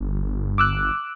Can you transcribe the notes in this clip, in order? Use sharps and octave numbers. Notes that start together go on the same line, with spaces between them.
G1
D6 E6 F#6